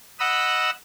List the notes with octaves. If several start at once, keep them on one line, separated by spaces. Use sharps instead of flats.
D#5 F#5 B5 E6